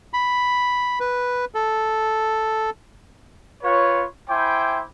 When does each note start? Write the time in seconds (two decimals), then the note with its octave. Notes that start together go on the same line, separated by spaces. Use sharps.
0.13 B5
1.00 B4
1.54 A4
3.63 F4 B4 C#5
4.29 E4 C5 G5 G#5 D6